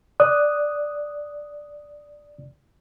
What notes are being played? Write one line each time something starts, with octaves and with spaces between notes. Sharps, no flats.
D5 D#6 F#6